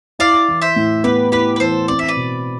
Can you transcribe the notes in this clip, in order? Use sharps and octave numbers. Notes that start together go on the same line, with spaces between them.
E4 D5 F5
E3
C5 E5
A2
B3 G4 B4
E4 G4 B4
B4
E3 A4 C5
C4 D5
E5
B4 D5
B2